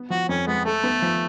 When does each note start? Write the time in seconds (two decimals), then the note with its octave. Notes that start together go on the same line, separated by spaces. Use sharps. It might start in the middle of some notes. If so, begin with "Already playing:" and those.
Already playing: B3
0.10 F3 F#4
0.29 F2 C#4
0.47 G#3 B3
0.65 A3 A4
0.84 B3
1.02 F3